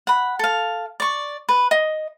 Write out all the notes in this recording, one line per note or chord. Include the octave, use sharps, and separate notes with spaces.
F#5 B5
A4 F5
D5 C#6
B4
D#5